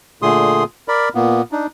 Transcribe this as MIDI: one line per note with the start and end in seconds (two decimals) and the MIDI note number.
0.22 0.64 46
0.22 0.64 50
0.22 0.64 57
0.22 0.64 68
0.22 0.64 84
0.22 0.64 87
0.88 1.09 70
0.88 1.09 74
0.88 1.09 83
1.15 1.42 46
1.15 1.42 58
1.15 1.42 59
1.52 1.67 62
1.52 1.67 63